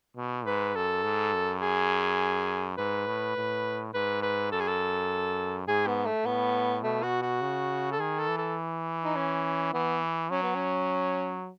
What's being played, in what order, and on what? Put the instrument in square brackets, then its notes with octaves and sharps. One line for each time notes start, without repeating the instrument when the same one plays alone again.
[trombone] B2
[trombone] G#2 [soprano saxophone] B4
[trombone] F#2 [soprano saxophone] A4
[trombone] G#2
F#2
[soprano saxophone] G#4
[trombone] G#2 [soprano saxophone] B4
[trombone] A2
A2
[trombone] G#2 [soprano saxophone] B4
[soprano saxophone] B4
[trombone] F#2 [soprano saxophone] A4
[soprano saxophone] G#4
A4
[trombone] G#2 [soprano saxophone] G#4
[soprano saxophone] B3
A3
[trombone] A2 [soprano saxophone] B3
[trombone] B2 [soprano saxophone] A3
[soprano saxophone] F#4
F#4
[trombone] C#3
[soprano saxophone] A4
[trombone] D#3 [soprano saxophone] G#4
[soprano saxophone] A4
[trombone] E3
[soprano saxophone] A4
D#4
C#4
[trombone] E3 [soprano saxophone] B3
[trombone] F#3 [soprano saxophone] C#4
[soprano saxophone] B3
C#4